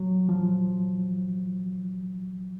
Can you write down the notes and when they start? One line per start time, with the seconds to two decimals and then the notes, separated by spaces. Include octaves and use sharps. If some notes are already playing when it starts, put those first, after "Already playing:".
Already playing: F#3
0.29 F3